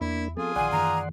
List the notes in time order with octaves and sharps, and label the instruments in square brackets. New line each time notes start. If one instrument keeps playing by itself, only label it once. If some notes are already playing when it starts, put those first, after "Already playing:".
[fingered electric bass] E2 [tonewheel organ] A#3 D4 [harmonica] E4
[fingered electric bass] F3 B3 C4 [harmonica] F4 G#4 [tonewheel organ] A4
[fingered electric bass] A#1 D#3 [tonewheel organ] D5 F#5 C6 [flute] G#5
[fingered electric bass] F#2 D#3 E3 [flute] A#5